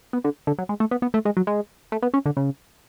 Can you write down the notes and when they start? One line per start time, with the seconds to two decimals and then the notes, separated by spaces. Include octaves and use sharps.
0.13 B3
0.24 D3
0.47 D3
0.58 F#3
0.69 G#3
0.80 A3
0.91 B3
1.02 B3
1.14 A3
1.25 G#3
1.37 F#3
1.47 G#3
1.92 A3
2.02 B3
2.14 C#4
2.26 D3
2.37 C#3